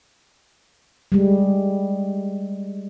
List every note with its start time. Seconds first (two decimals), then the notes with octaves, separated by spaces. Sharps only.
1.12 G3 G#3